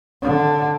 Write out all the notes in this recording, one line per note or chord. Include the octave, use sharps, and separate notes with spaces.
D3